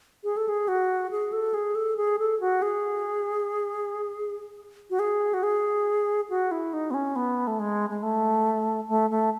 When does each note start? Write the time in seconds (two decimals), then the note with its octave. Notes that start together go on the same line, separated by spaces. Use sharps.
0.24 G#4
0.37 A4
0.49 G#4
0.68 F#4
1.11 G#4
1.32 A4
1.54 G#4
1.75 A4
1.97 G#4
2.19 A4
2.40 F#4
2.62 G#4
4.90 F#4
4.99 G#4
5.34 F#4
5.43 G#4
6.30 F#4
6.51 E4
6.73 D#4
6.91 B3
6.94 C#4
7.16 B3
7.47 A3
7.59 G#3
7.90 G#3
8.03 A3
8.88 A3
9.10 A3